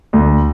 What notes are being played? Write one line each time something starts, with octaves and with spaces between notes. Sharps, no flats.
D2